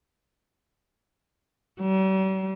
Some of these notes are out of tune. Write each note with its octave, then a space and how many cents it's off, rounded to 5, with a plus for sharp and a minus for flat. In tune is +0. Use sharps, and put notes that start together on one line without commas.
G3 -45